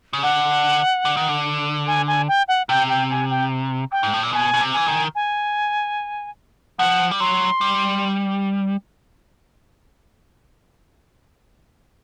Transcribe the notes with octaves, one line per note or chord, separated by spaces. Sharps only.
C#3
D3 F#5
D3
D#3
D3
G#5
G#5
G5
F#5
C3 G5
G5
G#5
G5
G5
G#2
A2
A#2
B2 G#5
B2
C3
E3 G#5
D#3
G#5
F3 F#5
G3
F#3 C6
G3